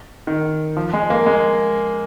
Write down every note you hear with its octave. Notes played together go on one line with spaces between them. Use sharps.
D#3
F3
G#3
A#3
G#3